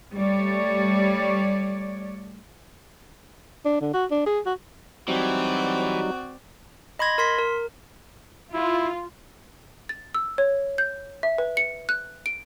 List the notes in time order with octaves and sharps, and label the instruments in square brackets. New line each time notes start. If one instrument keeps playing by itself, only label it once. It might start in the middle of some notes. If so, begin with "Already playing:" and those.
[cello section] G3 A3 C#5 D5
[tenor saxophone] D4
D3
F#4
D4
G#4
F#4
[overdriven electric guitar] E3 [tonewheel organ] F#3 G3 D#4 [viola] C4 D5 [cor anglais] F#4
[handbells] D#5 B5 C6 G#6 A#6
A#4 C6 B6
A#4
[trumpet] E4 [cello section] F4
[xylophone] A6
E6
C#5
G6
E5
B4
C#7
F#6
D7